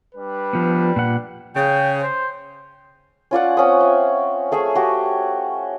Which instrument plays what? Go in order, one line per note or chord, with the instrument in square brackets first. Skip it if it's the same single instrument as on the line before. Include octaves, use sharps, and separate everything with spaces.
[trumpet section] G3 D4 B4
[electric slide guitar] F3 B3
A#2 F#5
[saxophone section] C#3 [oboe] G5
[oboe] C5
[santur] C#4 F4 D5 F#5
C4 C#4 D#6
E5
A3 G#4 C#5 E5
F#4 G4